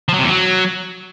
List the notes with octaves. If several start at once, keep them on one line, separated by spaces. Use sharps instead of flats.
F3
F#3
C3
E2
F#3